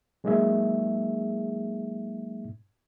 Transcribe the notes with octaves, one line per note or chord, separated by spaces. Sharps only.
F#3 G#3 A#3 D#4 G#4 E5